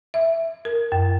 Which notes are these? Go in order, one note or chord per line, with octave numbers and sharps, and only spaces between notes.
E5
A#4
F#2